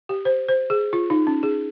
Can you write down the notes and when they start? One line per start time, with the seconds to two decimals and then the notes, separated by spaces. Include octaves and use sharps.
0.09 G4
0.25 C5
0.48 C5
0.70 G#4
0.93 F4
1.10 D#4
1.27 C#4
1.43 G#4